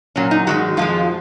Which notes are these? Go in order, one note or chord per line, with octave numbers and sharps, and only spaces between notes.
A#2 F#3 C#4
D#4
G#2 D#3 G#3 F#4
F2 F3 G#3 F4